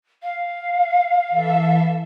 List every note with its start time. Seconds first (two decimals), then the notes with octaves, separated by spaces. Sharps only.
0.23 F5
1.30 E3 A4 E5